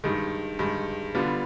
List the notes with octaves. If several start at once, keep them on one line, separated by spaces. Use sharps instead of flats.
G2 D#3 G#3
G2 D#3 G#3
D3 G3 B3 D4 F4